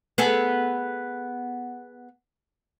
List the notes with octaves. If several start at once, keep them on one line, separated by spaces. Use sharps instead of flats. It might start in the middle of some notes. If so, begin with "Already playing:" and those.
B3 G#4 A4